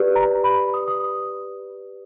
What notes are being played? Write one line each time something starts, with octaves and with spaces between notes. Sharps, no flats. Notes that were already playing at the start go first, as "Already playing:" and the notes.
Already playing: G4 B4 D5
A#5
B5
D#6
D#6